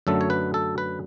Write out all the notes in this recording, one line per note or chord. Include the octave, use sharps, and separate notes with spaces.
F#2 D3 F#3 A3 A4
C#5
B4
A4
B4